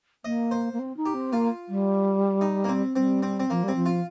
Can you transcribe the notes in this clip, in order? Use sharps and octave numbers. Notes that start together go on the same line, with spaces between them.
A#3 D#5
C5
A#3
C4
D#4
G4
C4
A#3 F4
G3
D#4
A#3
C4
G3 C4
C4
C4
F3 A#3
G3 C4
F3
F4